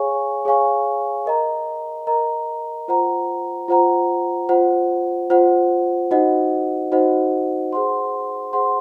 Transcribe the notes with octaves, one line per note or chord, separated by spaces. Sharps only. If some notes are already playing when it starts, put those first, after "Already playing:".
Already playing: G#4 C#5 F5 G#5 C#6
G#4 C#5 F5 G#5 C#6
A#4 D#5 A#5
A#4 D#5 A#5
F4 C5 F#5 A#5
F4 C5 F#5 A#5
F4 C5 F#5
F4 C5 F#5
D#4 F#4 C5 D#5 F#5
D#4 F#4 C5 D#5 F#5
G#4 C5 F#5 C6
G#4 C5 F#5 C6